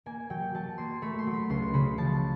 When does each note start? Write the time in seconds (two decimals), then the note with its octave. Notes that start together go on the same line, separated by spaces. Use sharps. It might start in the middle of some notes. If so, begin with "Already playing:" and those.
0.06 A#3 G#5
0.30 F#3 G5
0.54 F#3 A5
0.78 A#3 C6
1.02 A3 B5
1.19 C6
1.27 F#3
1.33 B5
1.49 C#2 C6
1.74 C#3 B5
1.98 F3 A5